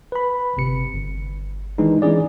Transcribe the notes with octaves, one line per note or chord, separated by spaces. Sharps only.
B4 B5
G1 C3 C#7
G1
D#3 E3 G#3 D4 D#4
E3 G#3 C#4 E4 G#4 D5